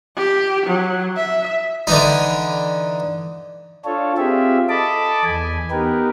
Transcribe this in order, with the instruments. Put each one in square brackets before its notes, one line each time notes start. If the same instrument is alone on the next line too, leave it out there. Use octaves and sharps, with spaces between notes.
[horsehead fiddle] G4
F#3
E5
[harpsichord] D3 E3 D#4
[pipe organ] D4 F4 A4 C#5
C4 F4 G4 G#4 E5
A4 D#5 A5 B5 D6
E2 G#5
B3 D#4 G4 A#4 B4